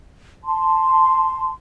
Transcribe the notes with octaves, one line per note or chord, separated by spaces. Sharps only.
A5 C6